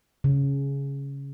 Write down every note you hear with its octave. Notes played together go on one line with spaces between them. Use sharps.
C#3